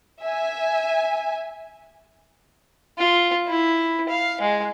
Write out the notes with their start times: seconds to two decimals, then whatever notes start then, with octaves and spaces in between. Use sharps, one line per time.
0.21 E5 G#5
2.98 F4
3.47 E4
4.09 F5
4.41 G#3